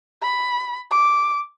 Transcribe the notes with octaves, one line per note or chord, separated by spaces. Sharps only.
B5
D6